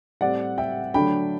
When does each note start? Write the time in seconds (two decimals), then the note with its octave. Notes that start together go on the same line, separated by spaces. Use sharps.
0.21 A2 G3 C4 D5 F#5
0.58 E5 G5
0.94 D3 F#3 A3 D4 G5 B5